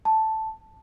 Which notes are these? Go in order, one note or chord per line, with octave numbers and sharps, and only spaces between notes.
A5